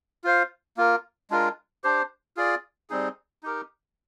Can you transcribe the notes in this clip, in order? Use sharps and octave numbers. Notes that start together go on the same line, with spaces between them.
F4 C5 F5
A#3 F4 A#4
G#3 D4 F4 A#4
D4 G4 C5
F4 G#4 D5
G3 C4 D#4 G#4
D#4 G4 A#4